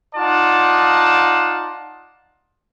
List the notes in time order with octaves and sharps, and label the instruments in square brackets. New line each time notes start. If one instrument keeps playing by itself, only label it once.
[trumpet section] D#4 F4 D5 F#5 A5